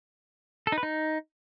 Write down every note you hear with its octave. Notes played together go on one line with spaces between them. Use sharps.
A4
D#4
B4
D#4